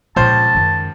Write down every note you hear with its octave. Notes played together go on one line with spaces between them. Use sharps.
C#2 A#2 F3 C4 C5 A5
F#2 D#3